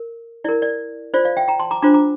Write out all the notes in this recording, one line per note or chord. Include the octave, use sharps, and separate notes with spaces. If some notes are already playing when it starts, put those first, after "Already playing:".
Already playing: A#4
E4 A#4 D5
D5
F4 C5 D5
D5 F5
E5 G5
G5 A#5
A5 C6
A#5 D6
D4 F4 C5 A#5 D6
A#5 D6